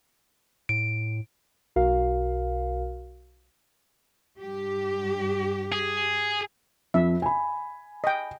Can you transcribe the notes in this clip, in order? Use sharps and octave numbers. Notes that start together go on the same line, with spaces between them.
A2 D7
B1 F#4 A#4 F5
G2 G4
G#4
F2 E5
G#5 B5
D#5 G5